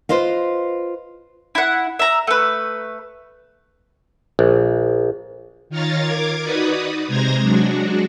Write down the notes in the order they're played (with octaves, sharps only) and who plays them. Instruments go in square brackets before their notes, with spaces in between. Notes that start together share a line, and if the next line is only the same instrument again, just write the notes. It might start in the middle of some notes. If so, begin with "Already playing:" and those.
[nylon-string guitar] F4 B4 C5 D#5 F5
[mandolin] E4 F#5
E5 A#5
A3 B4
[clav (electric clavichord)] A#1
[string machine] D#3 F4 C#5 F5 A#5 A6
A#4 D6 G#6
D#4 F#4 B4 D5 D#6
C3 G#3 C5 A#5 G#6 A#6
F#3 G#3 D4 F#4